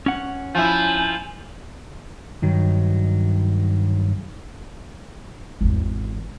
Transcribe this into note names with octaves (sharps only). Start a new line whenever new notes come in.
C#4 F#5
F3 E4 G#5 G6
G2 D#3 F#3
G#1 E2